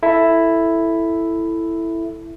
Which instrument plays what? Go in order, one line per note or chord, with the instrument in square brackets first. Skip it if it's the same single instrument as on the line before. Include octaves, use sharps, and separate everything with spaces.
[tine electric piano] E4 A4 E5